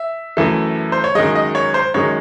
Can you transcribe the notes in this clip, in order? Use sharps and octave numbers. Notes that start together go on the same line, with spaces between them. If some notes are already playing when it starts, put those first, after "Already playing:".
Already playing: E5
F#2 E3 A3
C5
C#5
F#2 D#3 G#3 D#5
D#5
C#5
C5
F#2 D#3 G#3 C#5